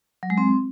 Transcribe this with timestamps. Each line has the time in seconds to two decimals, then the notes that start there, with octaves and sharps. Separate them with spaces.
0.23 F#3
0.30 G#3
0.38 C4